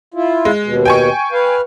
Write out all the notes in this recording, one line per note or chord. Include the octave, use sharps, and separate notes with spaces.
E4 F4
G#3
D#2 B2
G5 G#5 C#6
B4 F5